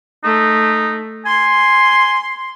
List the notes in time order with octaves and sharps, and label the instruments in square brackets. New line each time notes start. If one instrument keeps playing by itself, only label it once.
[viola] A3 [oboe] D#4
[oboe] G#5 [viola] C6